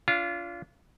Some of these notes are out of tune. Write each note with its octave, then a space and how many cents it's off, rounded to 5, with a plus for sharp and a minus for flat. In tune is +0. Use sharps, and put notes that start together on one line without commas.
D4 -35 F4 -15